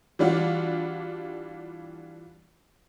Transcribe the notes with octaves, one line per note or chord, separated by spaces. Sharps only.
E3 G3 D4 F4 F#4